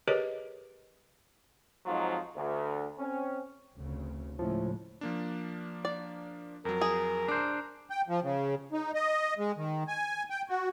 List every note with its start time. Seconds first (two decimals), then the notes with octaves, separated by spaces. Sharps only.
0.08 G4 G#4 A#4 B4 C#5 D#5
1.86 F2 G#2 F3 F#3 D#4 F4
2.35 D2
2.98 C4 C#4
3.75 F1 D2 C#3
4.39 A2 C#3 F3 G#3 A3
5.01 F3 A#3 D4
5.85 D5
6.65 F2 F#3 A#4
6.81 G#4
7.28 D4 C5 A#5
7.90 G5
8.08 F3
8.23 C#3
8.73 D#4
8.94 D#5
9.38 G#3
9.57 D#3
9.88 G#5
10.30 G5
10.49 F#4